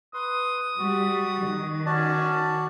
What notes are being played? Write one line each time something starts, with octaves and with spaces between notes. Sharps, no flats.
B4 C6 D#6
G3 F#4
D#3
C#4 F#4 D5 A5